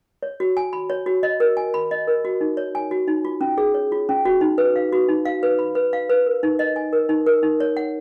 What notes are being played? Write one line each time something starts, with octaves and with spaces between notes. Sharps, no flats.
C#5
F#4
G#5
B5
C#5
F#4
D#5
A#4
G#5
B5
D#5
A#4
F#4
D#4
C#5
G#5
F#4
D#4
F4
C#4
G#4
C#5
F4
C#4
F#4
D#4
B4
F5
F#4
D#4
F5
B4
B5
B4
F5
B4
A#4
D#4
D#5
G#5
A#4
D#4
A#4
D#4
C#5
F#5